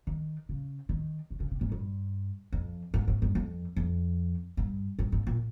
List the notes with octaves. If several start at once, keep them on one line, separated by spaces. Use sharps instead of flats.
D#3
C#3
D#3
D#3
C#3
C3
G#2
G2
F2
G#2
G#2
G2
F2
F2
G2
G2
G#2
A#2